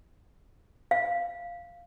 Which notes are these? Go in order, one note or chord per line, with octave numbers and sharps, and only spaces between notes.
F5